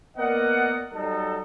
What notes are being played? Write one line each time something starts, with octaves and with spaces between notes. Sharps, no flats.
A#3 B3 A#4 D5 D#5 F#5
F#3 G3 D#4 A4